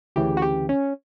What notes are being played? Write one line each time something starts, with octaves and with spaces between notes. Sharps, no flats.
D2 C#3 E3 G4
F#4
G4
C#4